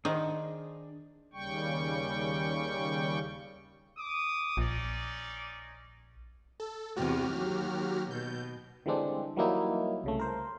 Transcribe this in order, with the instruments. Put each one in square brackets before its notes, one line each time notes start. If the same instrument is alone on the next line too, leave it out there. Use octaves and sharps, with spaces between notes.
[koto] D#3 [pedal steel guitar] D4 G#4 D#6 [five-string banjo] C5 D#5 F#5
[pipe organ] D#2 C#3 G3 G5 C#6
[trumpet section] D6 D#6
[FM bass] A#1 [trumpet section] C#4 D#4 D5
[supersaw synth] A4
[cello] E2 C3 [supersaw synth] F#4 G4 F6
[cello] D#2 F#3
[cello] B2 [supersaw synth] G6
[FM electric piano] D3 E3 G3 G#3 C4 D4
E3 F#3 G3 A#3 D#4 E4
C2 C#3 A3
A#4 C5